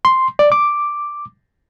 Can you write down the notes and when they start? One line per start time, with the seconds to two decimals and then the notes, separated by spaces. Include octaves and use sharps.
0.05 C6
0.39 D5
0.52 D6